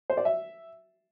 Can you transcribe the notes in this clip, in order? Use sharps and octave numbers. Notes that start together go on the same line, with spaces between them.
C5
D5
E5